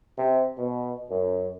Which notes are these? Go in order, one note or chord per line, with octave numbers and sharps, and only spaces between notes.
C3
B2
F#2